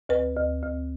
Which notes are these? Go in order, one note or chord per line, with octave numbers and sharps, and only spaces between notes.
D2 B4
D2
D2